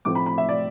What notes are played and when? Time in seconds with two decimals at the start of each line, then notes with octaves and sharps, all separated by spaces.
0.05 A2 F3 A3 C4 D6
0.15 B5
0.26 B5
0.38 E5
0.49 D5